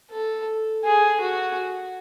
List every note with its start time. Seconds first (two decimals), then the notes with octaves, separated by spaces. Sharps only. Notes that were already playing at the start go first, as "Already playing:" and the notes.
0.11 A4
0.84 G#4
1.21 F#4